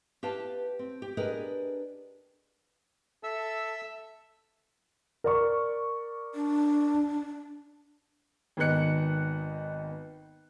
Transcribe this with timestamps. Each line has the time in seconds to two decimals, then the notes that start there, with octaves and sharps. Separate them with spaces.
0.23 G4 B4 F5 A5
0.79 C4
1.02 G4
1.17 D4 G4 G#4 A#4 B4 D#5
3.24 A4 E5 E6
5.24 A#4 D5 C#6
6.34 D4
8.57 G#1 D#3 B3 D#4 F#6 C#7